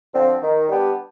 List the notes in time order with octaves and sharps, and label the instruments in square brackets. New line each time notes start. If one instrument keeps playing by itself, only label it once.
[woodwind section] D3 F3 C4
D#3
G3 B3 D4 G4